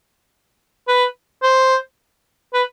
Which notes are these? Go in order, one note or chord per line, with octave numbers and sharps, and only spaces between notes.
B4
C5
B4